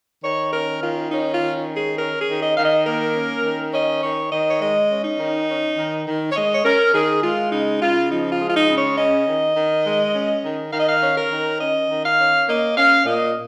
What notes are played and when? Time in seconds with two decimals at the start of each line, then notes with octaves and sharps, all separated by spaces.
0.24 D#3 C#5
0.53 C#4 A#4
0.82 D#3 F4
1.11 C#4 D#4
1.33 F4
1.40 D#3
1.70 C#4
1.77 G#4
1.99 C#4 A#4
2.21 G#4
2.28 D#3
2.43 D#5
2.58 D#3 F5
2.64 D#5
2.86 A#3 A#4
3.15 C#4
3.45 D#3
3.73 C#4 D#5
4.03 D#3 C#5
4.32 D#3 D#5
4.49 C#5
4.61 G#3 D#5
4.90 C#4
5.05 D#4
5.19 D#3
5.48 C#4
5.77 D#3
6.07 D#3
6.31 C#5
6.35 G#3 D#5
6.53 C#5
6.65 C#4 A#4
6.94 D#3 G#4
7.23 G#3 F4
7.52 C#3 D#4
7.81 C#3 F4
8.11 F3 D#4
8.32 F4
8.40 G#3
8.49 F4
8.55 D#4
8.69 C#3
8.77 C#5
8.98 C#4 D#5
9.27 D#3
9.56 D#3
9.86 G#3
10.15 C#4
10.43 D#3
10.73 D#3 F5
10.80 D#5
10.88 F5
11.02 C#4
11.17 A#4
11.31 D#3
11.60 C#4 D#5
11.90 D#3
12.04 F5
12.19 C#4
12.48 A#3 D#5
12.77 C#4 F5
13.06 A#2 D#5